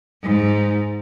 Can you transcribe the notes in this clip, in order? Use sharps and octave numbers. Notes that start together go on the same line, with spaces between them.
G#2